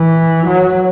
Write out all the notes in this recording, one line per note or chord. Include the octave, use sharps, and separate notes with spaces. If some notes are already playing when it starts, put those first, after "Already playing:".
Already playing: E3
F#3